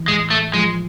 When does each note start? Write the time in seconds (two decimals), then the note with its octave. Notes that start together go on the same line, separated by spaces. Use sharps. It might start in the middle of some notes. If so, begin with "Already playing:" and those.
Already playing: E3
0.08 A2 G#3
0.30 A3
0.54 F3 G#3